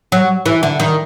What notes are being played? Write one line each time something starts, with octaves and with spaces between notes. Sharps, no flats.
F#3
E3
D3
D#3